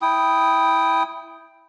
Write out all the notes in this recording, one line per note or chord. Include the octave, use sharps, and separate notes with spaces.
E4 G5 D#6